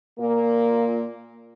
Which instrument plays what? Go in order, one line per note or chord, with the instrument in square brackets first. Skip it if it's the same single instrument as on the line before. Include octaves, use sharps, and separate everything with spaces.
[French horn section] A#2 A#3